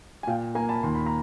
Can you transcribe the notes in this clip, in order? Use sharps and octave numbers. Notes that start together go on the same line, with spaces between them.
G#5
A#2 F5 G5
A#3 G#5 A#5
A5 B5
D#2 C6
B5
A#5